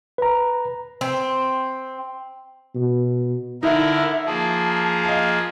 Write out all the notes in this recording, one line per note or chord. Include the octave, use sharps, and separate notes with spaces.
B4 A#5
C4
B2
D3 D#4 E4 A#4 E5
F3 A#3 G#4 A5
D#5 F5